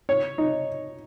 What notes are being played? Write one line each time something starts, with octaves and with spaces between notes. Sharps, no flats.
C#5
D#4